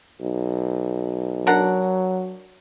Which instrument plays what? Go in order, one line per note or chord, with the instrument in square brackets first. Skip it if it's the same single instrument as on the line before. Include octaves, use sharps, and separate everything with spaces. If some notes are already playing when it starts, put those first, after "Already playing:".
[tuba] B1
[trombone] F#3 [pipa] D4 A#4 F#5